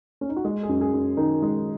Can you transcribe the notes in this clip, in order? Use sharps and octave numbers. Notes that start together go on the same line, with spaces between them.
C#4
D#4
F#4
G#3 G#4
G#4
F#2
G#4
F#2
D#3 D#4
G#3